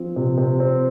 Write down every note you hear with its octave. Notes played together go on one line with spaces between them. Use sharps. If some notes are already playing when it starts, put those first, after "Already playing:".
Already playing: F3 C4
C3
C3
C4